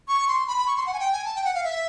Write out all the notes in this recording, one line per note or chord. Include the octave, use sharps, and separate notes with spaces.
C#6
C6
B5
B5
C#6
C6
F#5
G#5
G5
G#5
A5
G5
F#5
F5
E5